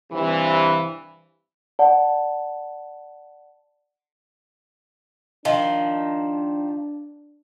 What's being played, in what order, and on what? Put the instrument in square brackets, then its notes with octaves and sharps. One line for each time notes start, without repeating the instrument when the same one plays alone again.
[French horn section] G2 C3 E3
[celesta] D5 F#5 A5
[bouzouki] D#3 F3 [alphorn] D4